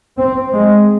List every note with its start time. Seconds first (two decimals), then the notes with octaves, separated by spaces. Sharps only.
0.19 C4
0.53 G#3